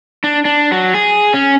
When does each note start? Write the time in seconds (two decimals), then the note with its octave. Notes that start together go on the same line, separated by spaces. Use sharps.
0.24 D4
0.45 D4
0.72 F#3
0.94 G#4
1.34 C#4